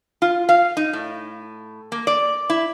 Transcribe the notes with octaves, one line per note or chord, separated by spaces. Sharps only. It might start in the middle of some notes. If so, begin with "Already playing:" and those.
F4
F5
D#4
A2
A#3
D5
E4